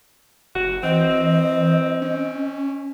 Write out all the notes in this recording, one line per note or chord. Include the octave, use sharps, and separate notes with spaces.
F#1 F#4
E3 C4 D#5
C#4